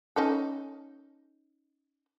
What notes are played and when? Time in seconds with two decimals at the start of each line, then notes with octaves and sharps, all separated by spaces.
0.16 C#4 D#4 A4